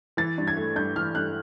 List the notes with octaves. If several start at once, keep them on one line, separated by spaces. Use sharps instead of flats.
E3 A6
G2
G#6
A3
G2 G6
E3 F6
G2 F#6